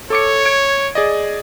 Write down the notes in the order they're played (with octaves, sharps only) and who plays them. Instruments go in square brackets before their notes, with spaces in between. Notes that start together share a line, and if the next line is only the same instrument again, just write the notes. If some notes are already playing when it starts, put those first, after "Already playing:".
[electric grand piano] A4 D6 C#7 [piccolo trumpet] C#5
[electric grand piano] G#6 D7
G#4 D5 D#5